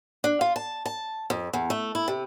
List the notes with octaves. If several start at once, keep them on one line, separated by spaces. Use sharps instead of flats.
D4
F4
A5
A5
F2
E2
A3
E4
C3